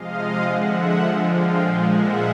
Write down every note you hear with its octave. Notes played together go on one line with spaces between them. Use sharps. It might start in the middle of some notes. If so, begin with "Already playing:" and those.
Already playing: C3 F3 G#3 D#5 F5
D3 F3 G#3 E5 F#5
D3 F3 G#3
F5 G5
A#2 F3 G#3
E5 F#5